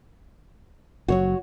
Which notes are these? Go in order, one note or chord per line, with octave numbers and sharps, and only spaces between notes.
F#1 F#3 F#4 C#5